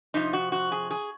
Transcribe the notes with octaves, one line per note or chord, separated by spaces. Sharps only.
F2 C3 F3 D#4
F#4
F#4
G#4
G#4